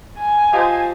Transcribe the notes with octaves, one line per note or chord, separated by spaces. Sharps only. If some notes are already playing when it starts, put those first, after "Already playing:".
G#5
F4 G4 C5 D#5 F5 A5